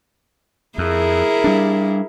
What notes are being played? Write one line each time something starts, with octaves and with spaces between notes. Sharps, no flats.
F2 E4 G#4 A#4
G3 D4